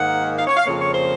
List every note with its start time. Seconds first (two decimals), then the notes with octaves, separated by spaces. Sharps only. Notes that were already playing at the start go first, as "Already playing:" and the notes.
Already playing: G#2 D#3 A#3 F#5
0.38 F5
0.47 C#5
0.57 F5
0.66 F2 C#3 F3 A#3 C#5
0.80 C#5
0.94 C5